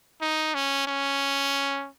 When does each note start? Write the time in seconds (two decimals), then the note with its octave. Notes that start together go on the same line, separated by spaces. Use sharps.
0.21 D#4
0.54 C#4
0.87 C#4